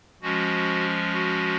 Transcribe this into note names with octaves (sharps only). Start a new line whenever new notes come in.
F3 G#3 C#4 F#4
F#4